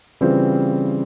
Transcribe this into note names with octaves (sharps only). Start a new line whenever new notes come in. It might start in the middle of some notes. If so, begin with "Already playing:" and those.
C#3 E3 G3 C4 F4